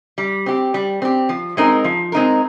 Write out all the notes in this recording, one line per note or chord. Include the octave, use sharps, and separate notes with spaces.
G3
C4 G4
G3
C4 G4
F3
G#3 C4 D#4 A#4
F3
G#3 C4 D#4 A#4